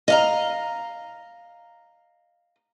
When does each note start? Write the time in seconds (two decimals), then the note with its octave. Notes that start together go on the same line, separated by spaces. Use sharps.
0.08 D#5 F5 A#5